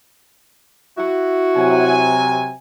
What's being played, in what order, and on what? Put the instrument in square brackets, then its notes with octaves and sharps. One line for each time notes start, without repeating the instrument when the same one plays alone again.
[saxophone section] E4 F#4
[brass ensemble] C3 F#3 G#5